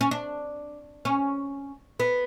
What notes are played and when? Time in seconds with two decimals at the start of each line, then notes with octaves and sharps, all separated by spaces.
0.01 C#4
0.11 D4
1.05 C#4
2.00 B3